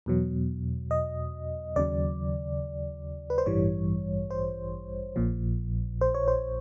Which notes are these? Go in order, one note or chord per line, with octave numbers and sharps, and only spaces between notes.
E2 B2 F#3
D#5
D#2 C#3 F#3 D5
B4
C5
A1 G2 E3 G3 C#5
C5
A#1 A#2 F3
C5
C#5
C5